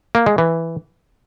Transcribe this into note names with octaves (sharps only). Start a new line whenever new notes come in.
A#3
G#3
E3